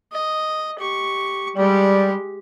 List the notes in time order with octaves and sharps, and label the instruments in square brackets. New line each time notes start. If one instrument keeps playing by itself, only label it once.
[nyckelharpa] D#5
G4 C#6
[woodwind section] G3 [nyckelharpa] G#3 G4